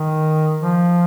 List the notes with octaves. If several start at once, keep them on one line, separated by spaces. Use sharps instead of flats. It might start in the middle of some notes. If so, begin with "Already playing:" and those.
Already playing: D#3
F3